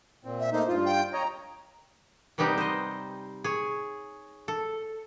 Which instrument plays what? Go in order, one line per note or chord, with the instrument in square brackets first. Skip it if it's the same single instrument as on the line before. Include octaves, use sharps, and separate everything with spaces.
[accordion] A#2 C4
[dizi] E5
[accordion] A3 A#3 D#4 [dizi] C5
[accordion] G2 F4
[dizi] G5
[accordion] C#5 D#5 [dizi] A#5
[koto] C3 G3 B3 D#4 G4
C5 D#5
G#4 C#5
A4